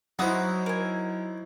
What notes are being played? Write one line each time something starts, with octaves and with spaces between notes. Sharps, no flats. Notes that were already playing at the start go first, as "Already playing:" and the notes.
F#3 D#4 E4 F#4 B4 C5 D#6
A#4 G#5